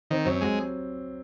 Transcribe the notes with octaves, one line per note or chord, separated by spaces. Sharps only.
D#3 C4
F#2 C4
F#3 G#3